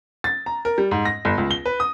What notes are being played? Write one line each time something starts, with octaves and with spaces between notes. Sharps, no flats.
A6
A#5
A#4
G3
G#2
A#6
G1
C#2
G7
B4
D#6